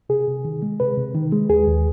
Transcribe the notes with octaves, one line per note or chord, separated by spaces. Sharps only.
C3 G#4
C3
D#3
G#3
C3 B4
C3
D#3
G#3
D#2 G#4
D#2